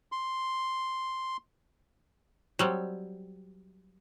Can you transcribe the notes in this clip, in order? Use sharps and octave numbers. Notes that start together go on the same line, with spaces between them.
C6
F#3 G3 C4